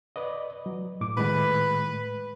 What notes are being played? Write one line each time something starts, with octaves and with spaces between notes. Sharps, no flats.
B4 D5 D#5
F#3
A2 D6
A2 D#3 G#3 B4